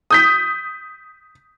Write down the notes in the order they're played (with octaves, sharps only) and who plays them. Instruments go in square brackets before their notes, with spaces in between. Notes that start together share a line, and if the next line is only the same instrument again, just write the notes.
[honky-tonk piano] D#6 G6 B6